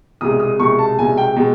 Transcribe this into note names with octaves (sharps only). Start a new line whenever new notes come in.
C2 B2 G#3 D#6
D#6
C2 B2 G#3 C#6
A5
C2 B2 G#3 G#5
G5
B2 G#3